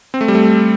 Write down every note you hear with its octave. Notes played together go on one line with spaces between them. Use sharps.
C4
A3
G3
A3